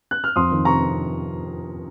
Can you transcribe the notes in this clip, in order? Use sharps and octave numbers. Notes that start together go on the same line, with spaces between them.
F#6
F6
F2 C6 D#6
D#3
C3 A#5 C#6